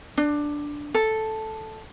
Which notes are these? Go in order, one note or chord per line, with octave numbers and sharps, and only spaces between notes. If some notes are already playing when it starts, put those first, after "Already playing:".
D4
A4